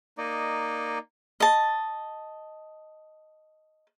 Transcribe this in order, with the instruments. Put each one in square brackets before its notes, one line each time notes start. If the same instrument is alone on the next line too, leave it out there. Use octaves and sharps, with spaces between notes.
[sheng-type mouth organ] A#3 D#4 D5 D#5
[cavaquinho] D#5 A5